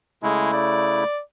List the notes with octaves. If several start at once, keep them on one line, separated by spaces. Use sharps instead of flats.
C#3 G#3 A3 E4
D5